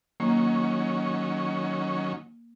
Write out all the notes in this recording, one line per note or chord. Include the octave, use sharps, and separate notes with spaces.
D#3 F#3 A#3 C#4